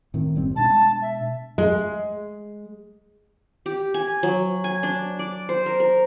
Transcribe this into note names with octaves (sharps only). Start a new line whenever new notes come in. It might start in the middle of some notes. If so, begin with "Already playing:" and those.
A2 D#3 C4
F#1 G3 C4
B2 G#3 D4 A5
E5
G#3
G4
G#5
F#3
G#5
D4
D5
C5
A#4
A#4